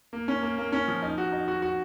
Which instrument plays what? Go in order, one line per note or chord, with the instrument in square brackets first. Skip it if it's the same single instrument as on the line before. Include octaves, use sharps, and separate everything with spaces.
[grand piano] A#3
C#4
A#3
A#3
C#4
F3
D#4
F#4
D#4
F#4
F#4